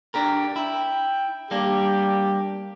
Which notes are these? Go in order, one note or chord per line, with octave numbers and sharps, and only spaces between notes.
D4 G4 A#4
E4 G5
G3 A#3 D4 G4